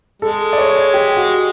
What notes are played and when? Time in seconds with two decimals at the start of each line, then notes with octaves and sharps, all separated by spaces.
0.22 G#3 A4
0.53 D5
0.58 C#5
0.94 G4
1.17 F#4